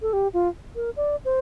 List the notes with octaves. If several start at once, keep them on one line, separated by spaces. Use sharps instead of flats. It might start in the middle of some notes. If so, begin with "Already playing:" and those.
A4
G4
F4
A#4
D5
C5